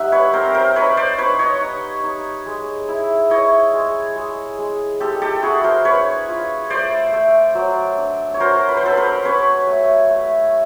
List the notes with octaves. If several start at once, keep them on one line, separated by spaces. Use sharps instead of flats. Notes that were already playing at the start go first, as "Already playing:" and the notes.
Already playing: G3 D#4 E5 F#5
B4 C#5
C4 A#4 C5
A#4 C5
D#4 B4 C#5
C5 D5
D#4 B4 C#5
C#5 D#5
D#4
D#4
G#3
E4
E4 C#5 D#5
G#3
G#3
G#3
G#3 G4 A4
G4 A4
E4 F#4 G#4
A#4 C5
D4 B4 C#5
F4
A3 C5 D5
A3
F#3
D4
C#5
F#3 A#4 C5
B4
C5
F#3 A4 B4
A#4 C5
C#4 B4 C#5
A3
A3